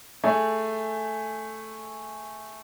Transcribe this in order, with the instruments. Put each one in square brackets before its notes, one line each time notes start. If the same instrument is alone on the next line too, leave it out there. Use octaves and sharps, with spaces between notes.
[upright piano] A3 G#4